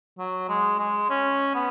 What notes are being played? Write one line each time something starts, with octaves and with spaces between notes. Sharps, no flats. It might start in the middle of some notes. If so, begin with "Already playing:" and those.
F#3
G#3
G#3
C#4
B3